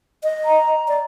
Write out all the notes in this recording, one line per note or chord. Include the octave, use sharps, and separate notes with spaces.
D#5
A#5
D5